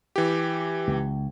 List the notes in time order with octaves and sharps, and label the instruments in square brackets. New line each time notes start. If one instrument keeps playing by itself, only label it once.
[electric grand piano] E3 G4
[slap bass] C#2